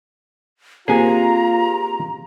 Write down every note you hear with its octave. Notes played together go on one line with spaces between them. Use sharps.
A#3 C4 F4 G4 G#4 G#5 A#5